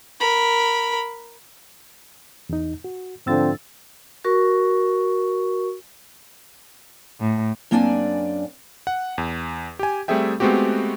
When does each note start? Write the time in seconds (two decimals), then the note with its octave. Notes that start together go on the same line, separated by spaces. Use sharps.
0.20 A#4 B5
2.49 E2 D#4
2.84 F#4
3.26 G#2 D3 F3 C4 E6 A6
4.24 F#4 A#4 C#6
7.20 A2
7.71 F#2 A#3 C4 D4 D5 G#5
8.87 F#5
9.18 E2
9.79 G4 G#5
10.08 G3 A3 C4 G#4 E5 G5
10.40 G#3 A3 B3 C4 F#4 G4